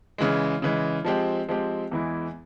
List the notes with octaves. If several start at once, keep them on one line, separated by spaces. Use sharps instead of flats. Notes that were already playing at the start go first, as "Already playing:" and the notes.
C#3 E3 G#3
C#3 E3 G#3
F3 G#3 C4 G4
F3 G#3 C4 G4
E2 E3 G#3 E4